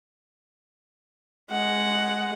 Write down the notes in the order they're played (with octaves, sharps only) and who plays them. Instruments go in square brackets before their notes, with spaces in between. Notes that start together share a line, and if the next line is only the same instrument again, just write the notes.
[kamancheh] G#3 F#5